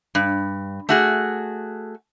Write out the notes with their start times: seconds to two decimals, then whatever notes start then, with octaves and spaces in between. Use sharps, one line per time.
0.15 G2
0.89 A3 F#4 G#4